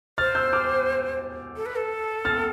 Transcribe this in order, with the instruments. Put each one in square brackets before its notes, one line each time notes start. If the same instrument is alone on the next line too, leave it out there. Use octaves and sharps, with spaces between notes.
[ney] C5 [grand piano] F6 A6
[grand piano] E6 G6
D6 F6
[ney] A4
B4
A4
[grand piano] F6 A6